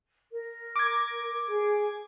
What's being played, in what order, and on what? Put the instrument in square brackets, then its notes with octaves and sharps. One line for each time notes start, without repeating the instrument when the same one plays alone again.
[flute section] A#4
[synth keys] D6 G#6
[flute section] G#4